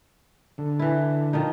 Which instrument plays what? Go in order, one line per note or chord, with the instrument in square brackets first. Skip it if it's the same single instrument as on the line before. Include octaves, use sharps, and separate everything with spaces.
[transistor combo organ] D3
[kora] E3 E4
D#3 F3 D#4